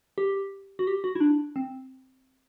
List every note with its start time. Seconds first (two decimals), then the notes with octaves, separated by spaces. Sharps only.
0.18 G4
0.79 F#4
0.87 G4
1.04 F#4
1.15 E4
1.20 D4
1.56 C4